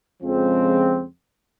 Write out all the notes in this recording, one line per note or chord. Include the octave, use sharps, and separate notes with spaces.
F2 C#3 F3 G#3 C4